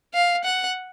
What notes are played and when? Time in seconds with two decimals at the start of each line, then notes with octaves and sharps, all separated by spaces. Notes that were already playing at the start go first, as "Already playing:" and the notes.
0.14 F5
0.45 F#5